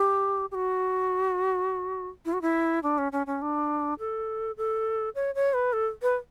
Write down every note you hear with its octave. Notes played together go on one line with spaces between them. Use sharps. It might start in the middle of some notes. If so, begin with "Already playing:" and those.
Already playing: G4
G4
F#4
E4
F#4
E4
D4
C#4
C#4
C#4
D4
A4
A4
C#5
C#5
B4
A4
B4